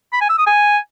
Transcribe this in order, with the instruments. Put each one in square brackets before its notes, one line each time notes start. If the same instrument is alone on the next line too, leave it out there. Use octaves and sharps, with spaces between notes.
[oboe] B5
G#5
E6
D#6
G#5